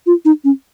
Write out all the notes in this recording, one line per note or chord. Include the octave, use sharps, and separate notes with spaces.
F4
D#4
C#4